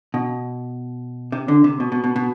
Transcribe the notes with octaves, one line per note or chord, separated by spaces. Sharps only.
B2
C3
D3
C3
B2
B2
B2
B2